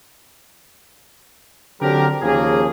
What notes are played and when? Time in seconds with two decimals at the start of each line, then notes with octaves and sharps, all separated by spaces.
1.82 D3 F#3 C4 D4 G4 A#4
2.22 D#2 C#3 F3 A#3 G#4